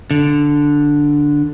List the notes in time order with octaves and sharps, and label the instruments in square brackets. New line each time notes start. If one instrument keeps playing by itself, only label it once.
[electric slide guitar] D3